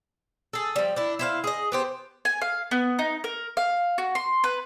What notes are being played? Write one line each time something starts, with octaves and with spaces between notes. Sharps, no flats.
G#4 A4
F3 G3
D4 E4
E4 C5 F5
G#4 D#5
B3 G4 C5
G#5
F5
B3
D#4
A#4
F5
F#4
C6
B4